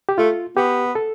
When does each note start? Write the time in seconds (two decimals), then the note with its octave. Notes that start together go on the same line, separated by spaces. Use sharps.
0.09 G4
0.18 A3 F4
0.56 B3 G4
0.95 A4